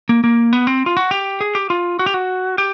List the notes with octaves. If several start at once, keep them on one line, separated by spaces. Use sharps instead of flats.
A#3
A#3
B3
C4
F4
F#4
G4
G#4
G4
F4
F#4
G4
F#4
G4